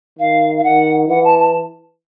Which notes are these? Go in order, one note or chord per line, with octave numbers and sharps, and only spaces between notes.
D#3 F5
F5
D#3 F#5
E3 F#5
A5
A5